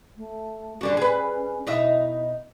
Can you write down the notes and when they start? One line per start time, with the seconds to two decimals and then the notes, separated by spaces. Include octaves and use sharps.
0.17 A3
0.81 D3 G3 C#4 F#4
0.97 G#4 B4
1.67 B2 D#4 E4 E5